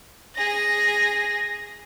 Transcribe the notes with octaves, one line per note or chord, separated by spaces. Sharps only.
G#4 A#6